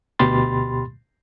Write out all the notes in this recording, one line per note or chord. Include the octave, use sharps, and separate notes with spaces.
D2 B2 G4 B5 C6 A6